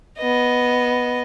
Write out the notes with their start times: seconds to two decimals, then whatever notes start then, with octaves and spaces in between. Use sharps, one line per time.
0.18 B3 D#5